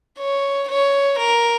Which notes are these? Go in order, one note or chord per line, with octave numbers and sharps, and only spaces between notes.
C#5
C#5
A#4